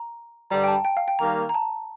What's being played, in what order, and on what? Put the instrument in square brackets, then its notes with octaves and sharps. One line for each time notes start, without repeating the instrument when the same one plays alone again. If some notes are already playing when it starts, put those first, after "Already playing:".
Already playing: [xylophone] A#5
[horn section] G2 D3 G3 [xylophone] A#5
[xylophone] G5
A5
G5
F5
G5
[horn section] D#3 G3 A#3 [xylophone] A#5
[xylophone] A#5
A5